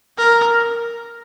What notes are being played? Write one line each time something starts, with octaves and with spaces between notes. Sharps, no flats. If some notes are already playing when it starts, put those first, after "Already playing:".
A#4